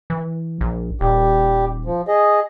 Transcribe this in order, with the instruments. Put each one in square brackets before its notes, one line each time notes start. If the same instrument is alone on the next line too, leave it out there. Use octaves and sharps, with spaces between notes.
[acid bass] E3
A#1
[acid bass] D#1 [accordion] G3 G4
[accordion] F3
G#4 D#5